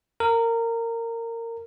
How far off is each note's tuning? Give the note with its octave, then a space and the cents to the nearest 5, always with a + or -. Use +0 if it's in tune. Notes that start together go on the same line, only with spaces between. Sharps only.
A#4 -20